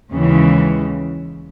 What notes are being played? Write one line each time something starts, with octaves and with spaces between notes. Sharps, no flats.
D#2 C#3 E3 G#3 C#4